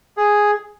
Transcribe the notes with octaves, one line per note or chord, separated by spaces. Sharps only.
G#4